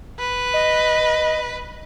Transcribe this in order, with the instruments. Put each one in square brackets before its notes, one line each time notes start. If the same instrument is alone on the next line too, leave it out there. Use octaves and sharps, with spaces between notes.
[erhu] B4
[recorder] D#5